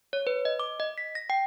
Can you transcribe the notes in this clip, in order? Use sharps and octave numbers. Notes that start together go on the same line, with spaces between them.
C#5
B4
D#5
D6
D#5
B6
A#6
G5